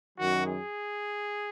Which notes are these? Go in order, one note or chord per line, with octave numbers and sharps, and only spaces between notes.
F#2 D#3 F#3 F#4
G#4